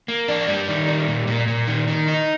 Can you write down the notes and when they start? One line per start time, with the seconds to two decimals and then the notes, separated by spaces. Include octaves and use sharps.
0.08 A#3
0.28 D4
0.47 G3
0.68 D#3
0.88 G3
1.08 A#2
1.27 A#2
1.48 A#2
1.67 D#3
1.88 D#3
2.08 D#4